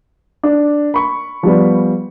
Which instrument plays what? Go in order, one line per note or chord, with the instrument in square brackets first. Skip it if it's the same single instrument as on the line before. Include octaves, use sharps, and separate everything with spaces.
[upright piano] D4
B5 C#6
[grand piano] F3 G3 B3